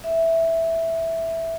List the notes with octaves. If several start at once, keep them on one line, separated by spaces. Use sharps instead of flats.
E5